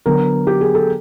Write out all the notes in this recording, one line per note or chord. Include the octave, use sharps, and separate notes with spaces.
D3 F#3 B3 A#4
G4
G#4
A4